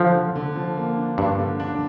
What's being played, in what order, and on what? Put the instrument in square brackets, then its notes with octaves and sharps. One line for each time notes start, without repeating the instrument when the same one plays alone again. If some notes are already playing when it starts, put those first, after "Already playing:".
Already playing: [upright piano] D3 [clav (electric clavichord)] F3
[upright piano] D3
D3
F3
A#3
D4
[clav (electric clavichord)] G2 [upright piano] D4
[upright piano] D3
D4